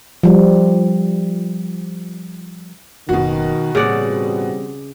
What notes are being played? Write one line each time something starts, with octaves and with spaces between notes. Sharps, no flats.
F3 G3
F#1 B2 D#3 F#4
A2 C#3 E3 G3 A#3 C4 D5 F#5